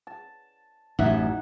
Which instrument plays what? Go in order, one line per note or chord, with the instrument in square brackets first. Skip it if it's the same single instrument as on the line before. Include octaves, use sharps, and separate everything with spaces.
[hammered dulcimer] A5
[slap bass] A1 F#2 [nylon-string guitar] D#4 E4 E5 [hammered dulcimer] F#5